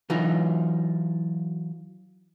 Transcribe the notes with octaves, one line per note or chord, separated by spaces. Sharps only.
E3 F#3 D#4 F4